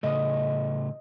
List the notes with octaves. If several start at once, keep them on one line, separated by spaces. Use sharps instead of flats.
A2 C#3 A3 D#5 D#6